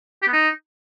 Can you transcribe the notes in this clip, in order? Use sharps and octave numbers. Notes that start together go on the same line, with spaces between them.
G4
B3
D#4